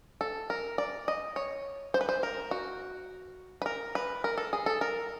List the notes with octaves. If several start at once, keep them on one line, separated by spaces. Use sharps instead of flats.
A4
A#4
D5
D#5
C#5
C5
B4
C5
A#4
F#4
B4
A#4
B4
A#4
A4
G#4
A4
A#4